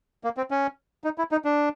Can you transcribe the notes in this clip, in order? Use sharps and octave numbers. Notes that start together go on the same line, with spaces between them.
A#3
C4
C#4
D#4
E4
D#4
D4